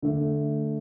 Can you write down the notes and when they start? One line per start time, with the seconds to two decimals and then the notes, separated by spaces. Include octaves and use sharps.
0.02 D3 A3